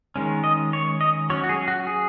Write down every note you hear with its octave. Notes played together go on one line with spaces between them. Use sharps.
D#3 G#3 C#4
D#5
C#5
D#5
F#3 C#4 C#5
F#4
G#4
F#4
G#4